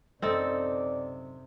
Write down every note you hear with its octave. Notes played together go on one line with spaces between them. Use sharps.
F#2 C3 C4 D#4 A4 D5